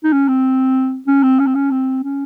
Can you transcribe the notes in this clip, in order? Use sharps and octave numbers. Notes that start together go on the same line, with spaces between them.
D#4
C#4
C4
C#4
C4
C#4
C4
C#4
C4
C#4